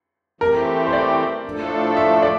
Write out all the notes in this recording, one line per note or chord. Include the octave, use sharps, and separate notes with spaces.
E3 A3 C4 G4 A#4
C5
D5
A2 F3 A3 D4 A4
E5
D5